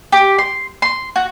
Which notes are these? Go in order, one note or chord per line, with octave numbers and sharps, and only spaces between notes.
G4
C6
C6
F#4